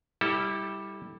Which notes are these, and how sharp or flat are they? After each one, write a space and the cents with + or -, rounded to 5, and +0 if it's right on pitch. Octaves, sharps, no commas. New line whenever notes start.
G3 +5 E4 -25 A4 +0